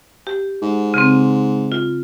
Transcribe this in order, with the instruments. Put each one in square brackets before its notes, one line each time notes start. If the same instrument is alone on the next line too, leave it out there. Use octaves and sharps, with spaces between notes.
[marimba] G4
[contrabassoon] G#2
[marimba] C#3 C4
F4